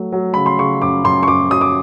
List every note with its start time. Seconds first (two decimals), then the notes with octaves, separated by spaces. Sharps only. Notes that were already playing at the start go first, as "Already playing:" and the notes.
Already playing: F#3 A3
0.12 F#3
0.34 C#3 B5
0.46 C6
0.58 C#3 C#6
0.82 F#2 D6
1.04 F#2 C6
1.23 C#6
1.28 F#2 D6
1.50 F#3 D#6
1.61 D6